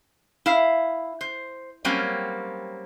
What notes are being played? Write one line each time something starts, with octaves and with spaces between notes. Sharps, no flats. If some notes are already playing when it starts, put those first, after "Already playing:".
E4 F5
C5
F#3 G3 A#3 C4 C#4